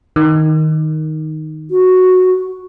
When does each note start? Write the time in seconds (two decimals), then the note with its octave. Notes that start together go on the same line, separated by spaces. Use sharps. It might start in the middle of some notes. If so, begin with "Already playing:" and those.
0.16 D#3
1.71 F#4